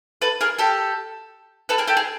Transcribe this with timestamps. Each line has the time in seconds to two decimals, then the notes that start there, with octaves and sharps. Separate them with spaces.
0.22 A4 B4
0.41 G#4 A#4
0.58 G4 A4
1.69 A4 B4
1.78 G#4 A#4
1.87 G4 A4
1.97 G#4